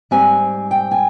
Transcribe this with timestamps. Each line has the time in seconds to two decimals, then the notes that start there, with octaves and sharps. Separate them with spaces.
0.11 G#2 G3 C4 G#5
0.71 G5
0.91 G#5